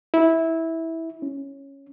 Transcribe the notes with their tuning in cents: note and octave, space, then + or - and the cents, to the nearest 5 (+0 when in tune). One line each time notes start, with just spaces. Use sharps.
E4 -15
C#4 -5